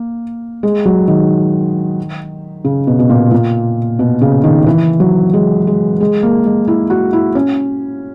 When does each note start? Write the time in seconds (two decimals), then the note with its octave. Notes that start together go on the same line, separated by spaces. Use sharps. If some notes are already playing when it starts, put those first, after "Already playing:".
Already playing: A#3
0.63 G#3
0.85 F#3
1.08 D#3
2.65 C#3
2.87 B2
2.99 B2
3.10 A#2
3.32 A#2
3.99 B2
4.21 C#3
4.44 D#3
4.67 E3
5.00 F#3
5.33 G#3
5.67 G#3
6.00 G#3
6.23 A#3
6.45 G#3
6.67 E4
6.90 F#4
7.13 E4
7.35 C#4